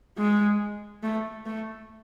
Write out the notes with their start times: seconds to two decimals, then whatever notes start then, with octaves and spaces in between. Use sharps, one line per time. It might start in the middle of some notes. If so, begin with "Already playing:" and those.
0.18 G#3
1.03 A3
1.46 A3